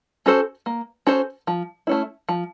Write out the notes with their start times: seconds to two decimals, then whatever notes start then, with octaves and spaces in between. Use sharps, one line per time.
0.26 C#4 F#4 A4 C5
0.66 A#3
1.07 C#4 F#4 A4 C5
1.47 F3
1.87 A3 C#4 E4
2.29 F3